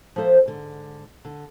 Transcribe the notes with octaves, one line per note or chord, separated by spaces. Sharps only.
F3 A#3 A4 C5 E5
G#2 D3
D3